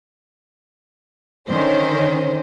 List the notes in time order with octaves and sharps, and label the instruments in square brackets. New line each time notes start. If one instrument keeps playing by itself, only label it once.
[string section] D3 D#3 C#4 C5